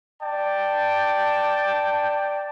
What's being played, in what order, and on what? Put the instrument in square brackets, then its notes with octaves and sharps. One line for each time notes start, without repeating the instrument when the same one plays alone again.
[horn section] D5 G5 A5